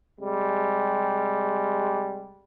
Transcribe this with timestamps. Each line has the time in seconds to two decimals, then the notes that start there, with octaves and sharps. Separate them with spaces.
0.19 C3 G3 G#3